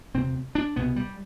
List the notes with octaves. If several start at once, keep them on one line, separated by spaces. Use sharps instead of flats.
E1 D2 C3 C4
D4
C2 B2 B3
G3